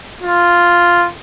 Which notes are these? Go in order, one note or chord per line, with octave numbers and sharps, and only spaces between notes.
F4